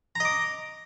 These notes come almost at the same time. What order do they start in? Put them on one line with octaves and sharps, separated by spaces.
A#5 D#5 D6